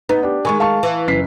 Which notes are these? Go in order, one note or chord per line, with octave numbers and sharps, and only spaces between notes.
B3 D#4
D4 G4
D#3 G#3 G#5 C#6
F5 A5 C#6
E3
F#1 B6 C7